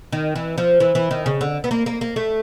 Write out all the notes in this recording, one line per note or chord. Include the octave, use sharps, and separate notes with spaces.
D#3
E3
F3
E3
E3
D#3
C#3
D3
B3
A#3
A#3
A#3
A3